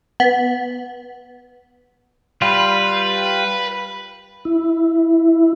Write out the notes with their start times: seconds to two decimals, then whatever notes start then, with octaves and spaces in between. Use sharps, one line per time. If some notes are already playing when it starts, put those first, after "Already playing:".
0.20 B3
2.42 G3 F4 B4
4.45 E4